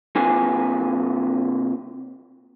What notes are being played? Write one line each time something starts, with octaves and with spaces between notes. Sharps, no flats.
C3 A#3 D4 F4 B4 G#5